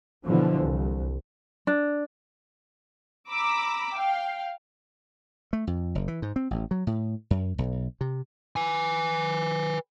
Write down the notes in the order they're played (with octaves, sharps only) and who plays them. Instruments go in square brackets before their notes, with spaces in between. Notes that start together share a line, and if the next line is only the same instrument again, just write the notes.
[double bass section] B2 D3 E3 F3
C2
[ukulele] D4
[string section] A#5 B5 D6 E6
F5 G5
[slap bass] A3
F2
F#1
E3
G#2
C4
A1
F#3
A2
F#2
B1
C3
[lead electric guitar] B4 G#5